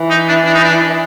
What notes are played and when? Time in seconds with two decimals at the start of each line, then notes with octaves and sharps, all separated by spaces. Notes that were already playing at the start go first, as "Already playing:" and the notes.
Already playing: E3
0.10 D#4
0.29 D4
0.46 E3 D4
0.54 D#4
0.65 D4